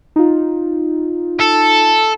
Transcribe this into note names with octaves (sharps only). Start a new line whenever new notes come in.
D#4 F4
A4